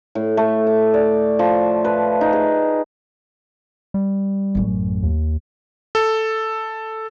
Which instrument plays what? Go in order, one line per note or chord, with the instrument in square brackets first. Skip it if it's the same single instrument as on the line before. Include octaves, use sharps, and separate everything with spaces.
[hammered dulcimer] A2
A3
D6
D5
F3
B4
D#4
G#4
[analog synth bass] G3
[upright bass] A1 F#2
[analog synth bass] D#2
[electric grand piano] A4